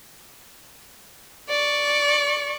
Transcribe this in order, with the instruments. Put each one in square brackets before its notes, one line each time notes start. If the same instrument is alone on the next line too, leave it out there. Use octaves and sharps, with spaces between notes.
[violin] D5 C#6